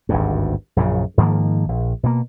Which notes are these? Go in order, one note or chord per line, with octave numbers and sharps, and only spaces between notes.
G#1 D2 G2
A#1 F#2 A#2 C#3
G#2 D#3 F3 A#3
A#1
B2 A#3